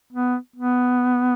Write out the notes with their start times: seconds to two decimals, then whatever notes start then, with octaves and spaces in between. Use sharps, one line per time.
0.12 B3
0.56 B3